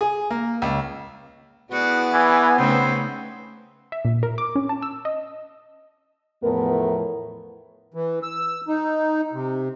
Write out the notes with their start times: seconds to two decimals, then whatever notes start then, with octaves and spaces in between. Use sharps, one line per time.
0.01 G#4
0.31 A#3
0.62 C#2
1.72 B3 E4 F#4 G#4 D5
2.13 E3 G#5
2.58 C#3 A3 C4 D#4 C5
3.92 E5
4.05 A#2
4.23 A#4
4.38 D6
4.55 C#4
4.69 A5
4.82 E6
5.05 D#5
6.43 E2 A2 F3 A3 B3 A#4
7.94 E3
8.23 E6
8.68 D#4
9.33 C3